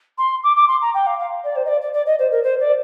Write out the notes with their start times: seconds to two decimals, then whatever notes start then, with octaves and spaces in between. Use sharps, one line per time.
0.18 C6
0.43 D6
0.56 D6
0.67 C6
0.81 A#5
0.94 G5
1.06 F5
1.18 F5
1.43 D5
1.55 C5
1.65 D#5
1.68 D5
1.81 D5
1.93 D5
2.06 D#5
2.18 C5
2.31 A#4
2.43 C5
2.59 D5